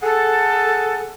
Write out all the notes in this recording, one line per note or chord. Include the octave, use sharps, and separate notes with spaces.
G#4 A4 F#5